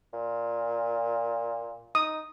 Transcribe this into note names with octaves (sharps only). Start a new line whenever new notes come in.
A#2
D#4 D#6